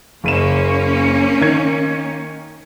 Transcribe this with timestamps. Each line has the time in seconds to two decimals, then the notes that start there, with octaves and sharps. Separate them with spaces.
0.24 F#1 A#3 C#4 D#7 E7
1.41 D#3 G#6